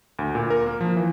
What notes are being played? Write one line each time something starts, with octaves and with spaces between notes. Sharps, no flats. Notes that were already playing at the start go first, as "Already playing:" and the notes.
D2
A#2
A#4
A#3
F3
E3